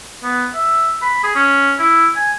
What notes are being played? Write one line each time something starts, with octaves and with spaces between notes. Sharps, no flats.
B3
E5
B5
G#4
C#4
E4
G#5